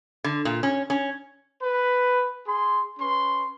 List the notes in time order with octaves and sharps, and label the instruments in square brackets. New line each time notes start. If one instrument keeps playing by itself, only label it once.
[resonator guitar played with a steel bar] D3
A#2
C#4
C#4
[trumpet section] B4
G#4 C6
C#4 B4 C6